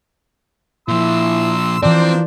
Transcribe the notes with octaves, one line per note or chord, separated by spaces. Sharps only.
A#2 F3 E4 C6 E6
E3 F3 A#3 C4 D4 C5 D5